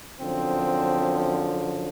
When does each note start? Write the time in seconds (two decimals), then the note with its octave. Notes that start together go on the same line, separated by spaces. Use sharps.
0.19 F#2 D3 F3 C4